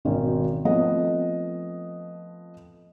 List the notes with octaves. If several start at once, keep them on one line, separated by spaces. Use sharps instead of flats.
G#1 B2 D#3 C#4
F3 A3 B3 C4 D#5